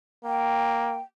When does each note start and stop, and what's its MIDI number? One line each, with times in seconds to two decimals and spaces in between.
0.24 0.99 58
0.24 1.00 79